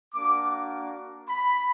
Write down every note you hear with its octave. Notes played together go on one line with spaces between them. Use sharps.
A#3 D4 F#4 D6
B5